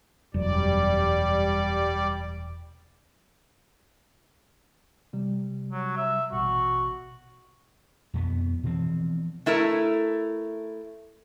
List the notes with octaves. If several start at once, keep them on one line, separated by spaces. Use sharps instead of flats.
E1 F#2 G3 D5
C3 G3
F#3
E5
A1 B2 F#4
F2 B2 B3
B2 E3 F3 C4
A3 E4 A4 A#4